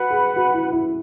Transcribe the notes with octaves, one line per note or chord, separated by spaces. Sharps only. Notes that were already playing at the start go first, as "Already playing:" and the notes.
Already playing: F#4 B4 F#5 B5
G#4
F#4
E4
E4